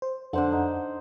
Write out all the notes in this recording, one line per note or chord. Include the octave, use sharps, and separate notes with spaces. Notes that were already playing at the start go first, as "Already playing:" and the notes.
C5
F2 D3 D4 A4 C5 F#5
D#4